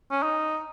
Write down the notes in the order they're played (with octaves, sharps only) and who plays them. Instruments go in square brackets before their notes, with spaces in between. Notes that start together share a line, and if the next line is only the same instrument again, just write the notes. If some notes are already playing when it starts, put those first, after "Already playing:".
[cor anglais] C#4
D#4